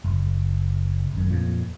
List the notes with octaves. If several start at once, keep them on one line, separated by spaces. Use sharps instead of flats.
F#1
G#1 F#2
F2 A#2